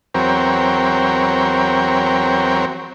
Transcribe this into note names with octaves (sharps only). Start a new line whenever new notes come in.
E2 F#3 C4 A#4 C#5 G5